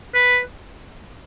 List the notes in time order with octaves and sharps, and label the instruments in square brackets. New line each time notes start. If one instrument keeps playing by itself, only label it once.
[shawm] B4